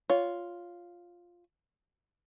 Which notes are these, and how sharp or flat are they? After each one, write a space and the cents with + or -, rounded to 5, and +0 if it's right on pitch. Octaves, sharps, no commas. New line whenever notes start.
F4 +0 C#5 +15